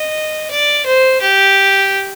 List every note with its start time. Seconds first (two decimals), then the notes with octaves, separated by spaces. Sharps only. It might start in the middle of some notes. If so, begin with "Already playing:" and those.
Already playing: D#5
0.51 D5
0.86 C5
1.21 G4